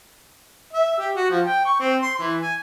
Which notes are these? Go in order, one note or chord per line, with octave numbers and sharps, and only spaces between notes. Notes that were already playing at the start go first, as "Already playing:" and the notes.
E5
G4
F#4
F3
G5
C#6
C4
C6
E3
G#5